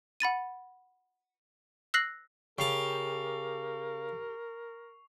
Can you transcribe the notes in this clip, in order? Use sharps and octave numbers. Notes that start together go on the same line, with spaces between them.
F#5 B5 A6 D#7
E6 F#6 A#6 C7 F#7
C#3 G4 A#4 A5 C#6 C7 F7